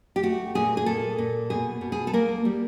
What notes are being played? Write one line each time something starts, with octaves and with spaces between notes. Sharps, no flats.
G4
A3 F#4
A#2 G#4
G#4
A#2 A4
A#2
B2 G#4
B2
G#4
A4
A#3 A#4
G3